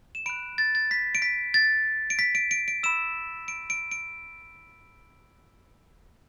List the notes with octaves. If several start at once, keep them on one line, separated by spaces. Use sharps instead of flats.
E7
B5 F#6 D7
A6
A6
B6
D7
B6
A6
D7
B6
D7
D7
D7
B5 E6 E7
D7
D7
D7